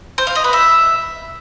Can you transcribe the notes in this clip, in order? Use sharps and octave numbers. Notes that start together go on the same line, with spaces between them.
C5
F5
D#5
B4
E5